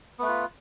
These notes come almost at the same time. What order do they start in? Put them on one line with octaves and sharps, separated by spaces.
B3 A3 B4 F4